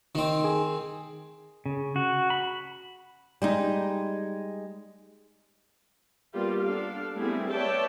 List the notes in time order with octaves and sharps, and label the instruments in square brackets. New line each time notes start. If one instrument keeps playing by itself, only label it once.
[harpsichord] D#3 C4 [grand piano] D#4
[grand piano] G#4
[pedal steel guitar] C#3
F#4
B5
[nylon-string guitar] G3 G#3 D#4
[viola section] G3 A#3 B3 F4 G4
D4 A4 F5
G3 A3 B3 C4 E4 G#4
B4 C#5 D5 E5 G5 A5